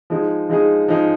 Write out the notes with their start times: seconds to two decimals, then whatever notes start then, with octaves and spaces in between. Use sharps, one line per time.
0.10 F3 G#3 D#4 G#4
0.49 F3 G#3 D#4 G#4
0.89 F3 G#3 D#4 G#4